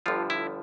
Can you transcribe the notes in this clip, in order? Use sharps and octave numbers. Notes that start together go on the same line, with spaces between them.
G1 G2 D3 F3 F4
E4